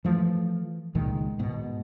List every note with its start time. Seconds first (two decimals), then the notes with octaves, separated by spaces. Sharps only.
0.05 E3 F3 A3
0.95 C#2 A#2 D#3 G#3
1.39 G#2 B2